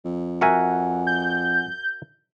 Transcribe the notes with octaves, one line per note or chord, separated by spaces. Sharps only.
F2
F#4 A#4 E5 F#5 G#5
G6